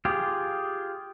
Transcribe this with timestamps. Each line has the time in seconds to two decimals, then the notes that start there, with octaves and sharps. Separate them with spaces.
0.05 F4 G4 G#4